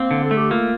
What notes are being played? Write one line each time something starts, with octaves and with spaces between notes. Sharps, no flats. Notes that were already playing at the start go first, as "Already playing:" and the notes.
Already playing: A#3 C4
D3
A4
A3
G4
A#3 F4